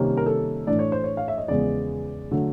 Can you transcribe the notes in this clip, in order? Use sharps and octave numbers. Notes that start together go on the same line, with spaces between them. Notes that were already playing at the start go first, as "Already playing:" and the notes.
Already playing: C3 D#3 G3 A#3 C#4
A#4
A4
A2 E3 A3 D4 D5
C#5
C5
C#5
F5
E5
D#5
E2 C#3 F3 G#3 B3 D5
D3 F#3 A3